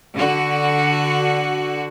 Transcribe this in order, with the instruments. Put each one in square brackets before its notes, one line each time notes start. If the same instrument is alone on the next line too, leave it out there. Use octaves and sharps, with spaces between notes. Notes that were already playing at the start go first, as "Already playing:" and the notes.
[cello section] D3 F#4